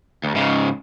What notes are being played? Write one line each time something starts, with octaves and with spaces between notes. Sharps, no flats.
D2
G#2 C#3